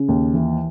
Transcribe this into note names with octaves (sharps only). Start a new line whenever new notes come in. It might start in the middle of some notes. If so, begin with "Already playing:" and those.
Already playing: C#3
D#2
E3